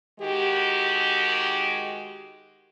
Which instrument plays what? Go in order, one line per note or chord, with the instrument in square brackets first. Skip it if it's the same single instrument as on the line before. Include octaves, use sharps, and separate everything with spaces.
[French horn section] D#3 G#3 F#4 G4